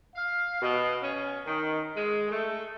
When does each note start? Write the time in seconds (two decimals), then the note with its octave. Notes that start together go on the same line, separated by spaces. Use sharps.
0.15 F5
0.62 B2
1.02 C#4
1.46 D#3
1.95 G#3
2.31 A3